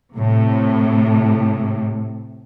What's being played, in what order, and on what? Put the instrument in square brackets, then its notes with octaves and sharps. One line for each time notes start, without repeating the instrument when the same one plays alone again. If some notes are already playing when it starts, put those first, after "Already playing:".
[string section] A2 C3